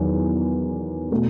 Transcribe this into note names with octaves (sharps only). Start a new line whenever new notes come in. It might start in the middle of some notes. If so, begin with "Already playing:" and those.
Already playing: E2 D#3 F#3
B2 A3